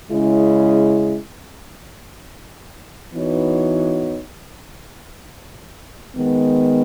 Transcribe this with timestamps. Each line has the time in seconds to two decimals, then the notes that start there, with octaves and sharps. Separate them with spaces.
0.11 C#3 G#3 C#4 E4
3.14 E3 B3 D#4 F#4 C#5
6.16 D#3 G#3 B3